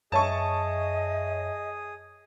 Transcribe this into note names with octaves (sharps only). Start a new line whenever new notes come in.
F#2 G#4 C#5 D#5 E5 A5 C#6 D#6